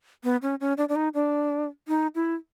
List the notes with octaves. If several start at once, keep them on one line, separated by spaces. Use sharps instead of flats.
B3
C#4
C#4
D4
D4
D#4
D4
D#4
E4